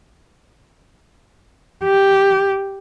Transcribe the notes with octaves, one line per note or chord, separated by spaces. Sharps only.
G4